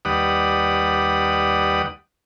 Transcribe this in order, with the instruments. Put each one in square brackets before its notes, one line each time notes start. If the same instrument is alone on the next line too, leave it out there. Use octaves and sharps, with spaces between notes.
[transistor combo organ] D#2 G3 B4 D5 F#5 D#6